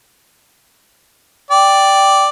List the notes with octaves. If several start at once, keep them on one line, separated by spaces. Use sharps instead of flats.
D5 G5